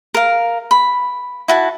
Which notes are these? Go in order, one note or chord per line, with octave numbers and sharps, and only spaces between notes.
A#4 F5
B5
E4 F#4 A5